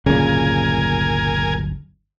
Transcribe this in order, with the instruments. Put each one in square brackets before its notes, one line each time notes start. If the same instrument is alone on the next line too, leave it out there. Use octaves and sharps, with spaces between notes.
[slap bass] D1 G1 F#3 [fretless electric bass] A#2 C#3 [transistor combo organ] A#4 G#5